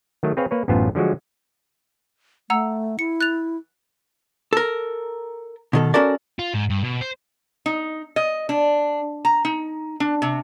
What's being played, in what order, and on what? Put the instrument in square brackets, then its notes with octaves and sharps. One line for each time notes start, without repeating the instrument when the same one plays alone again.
[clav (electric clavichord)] D#3 F#3 A3
C4 G#4 B4 C#5 F5
A#3 B4 C#5
A1 F#2 A2 B3 F4 C5
D3 F3 F#3 G#3 F#4
[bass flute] A3 [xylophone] F#5 A#5 E6
[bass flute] E4 [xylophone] C#7
[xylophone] F#6 A6 F7
[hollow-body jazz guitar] A4 A#4
B2 D#3 A4
C#4 F#4 A4 A#4 D5
[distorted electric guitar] F4
G#2
G2
B2
C5
[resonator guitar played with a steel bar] D#4
D#5
D4
A#5
D#4
D4
C3